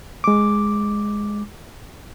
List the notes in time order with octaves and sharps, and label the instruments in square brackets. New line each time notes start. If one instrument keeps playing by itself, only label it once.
[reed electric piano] G#3 D6